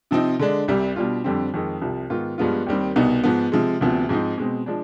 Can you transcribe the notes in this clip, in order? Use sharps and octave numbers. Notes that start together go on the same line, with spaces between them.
C3 F3 C4 D#4
D3 G#3 D4
C2 C3 G3
B2 G3 D4 F4
F2 D3 G3 C4
F2 D#3 G#3
C2 C3 F3
G#2 D#3 B3 F4
G2 F3 G#3 B3 F4
D#2 D#3 G3 C4
C2 B2 B3 D#4
G#2 F3 B3
C3 F3 G#3
D2 C3 F3 B3
G#2 F3 C4 D#4
B2 G#3 C4
F3 G#3 D4